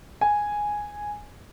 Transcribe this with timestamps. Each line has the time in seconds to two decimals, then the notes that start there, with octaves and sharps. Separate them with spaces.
0.21 G#5